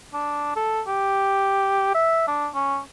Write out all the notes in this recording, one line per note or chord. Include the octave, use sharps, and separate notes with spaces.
D4
A4
G4
E5
D4
C#4